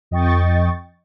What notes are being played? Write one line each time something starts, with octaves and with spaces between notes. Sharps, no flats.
F2 D#5 G5 C#6 A6